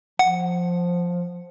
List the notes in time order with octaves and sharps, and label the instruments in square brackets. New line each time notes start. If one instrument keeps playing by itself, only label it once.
[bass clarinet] F3 [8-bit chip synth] F#5